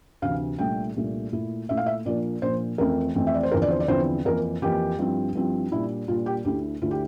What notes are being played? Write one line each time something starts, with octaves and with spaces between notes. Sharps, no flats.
D2 C3 E3 F5
C2 A#2 A3 D4 G5
C2 A#2 A3 D4
A#2 A3 E4
A#2 A3 E4 E5
F5
E5
A#2 F3 A#3 D4 D5
A#2 F3 A#3 D4 C5
F2 E3 A3 C4 A#4
F2 E3 A3 C4
E5
D5
C5
E2 D3 F3 C4 E4 A#4
D5
C5
D5
E2 D3 F3 C4 E4 C5
F2 E3 A#3 A#4
F2 E3 A#3 G4
G2 F3 C4 E4
G2 F3 C4 E4
A#2 G3 D4 E4
A#2 G3 D4 F4
G4
D2 D3 A3 E4 G4
D2 D3 A3 E4 F4
G4